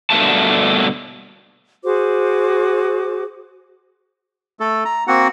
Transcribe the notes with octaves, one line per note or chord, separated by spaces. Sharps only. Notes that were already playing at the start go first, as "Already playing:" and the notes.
G2 B2 D3 A3 A#3 A5
F#4 G#4 C5 D6
A3 A4
A#5
A#3 C4 F#4 F#5